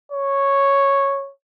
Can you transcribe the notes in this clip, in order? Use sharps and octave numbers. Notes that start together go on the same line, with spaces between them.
C#5